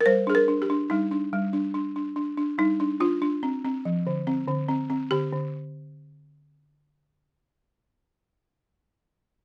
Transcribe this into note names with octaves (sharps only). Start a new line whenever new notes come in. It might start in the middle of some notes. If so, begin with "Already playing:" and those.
A#4
G3 C5
D4 G#4
A#4
D4
G4
D4
G3 D#4
D4
G3
D4
D4
D4
D4
D4
G3 D#4
D4
D4 F4
D4
C4
C4
F3
D3
C4
D3
C4
C4
D3 G4
D3